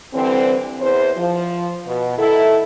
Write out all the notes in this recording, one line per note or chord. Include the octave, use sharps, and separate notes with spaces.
D3 E3 G3 C4
E2 C5
F3
B2
D#3 E4 A4